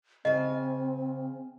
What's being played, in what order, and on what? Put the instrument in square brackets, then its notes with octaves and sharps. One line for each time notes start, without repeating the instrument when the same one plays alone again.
[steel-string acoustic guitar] C#3 G#5 [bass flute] C4 [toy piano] D#5